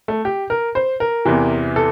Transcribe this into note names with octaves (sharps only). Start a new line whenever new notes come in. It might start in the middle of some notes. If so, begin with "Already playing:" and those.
A3
G4
A#4
C5
A#4
E2 C3 E3
A4